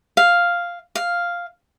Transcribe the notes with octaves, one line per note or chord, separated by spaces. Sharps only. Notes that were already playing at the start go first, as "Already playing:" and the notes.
F5
F5